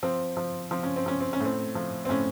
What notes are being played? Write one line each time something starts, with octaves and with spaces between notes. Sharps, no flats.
F3 C4
F3
F3 C4
C#4
C4
F3 C#4
C4
C#4
A2 C4
F3
C4
A2 C#4